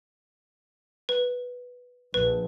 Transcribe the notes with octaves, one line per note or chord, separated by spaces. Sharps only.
B4
A#1 B4